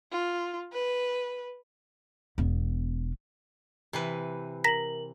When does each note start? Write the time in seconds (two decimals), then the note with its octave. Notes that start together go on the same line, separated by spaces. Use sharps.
0.12 F4
0.73 B4
2.38 E1 B3
3.93 C3 E3 B4
4.64 A#4 A#5 A#6 B6 F#7